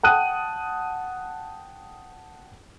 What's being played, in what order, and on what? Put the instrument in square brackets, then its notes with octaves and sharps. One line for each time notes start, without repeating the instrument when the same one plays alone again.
[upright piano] F#5 G5 A5 D#6 F#6 D#7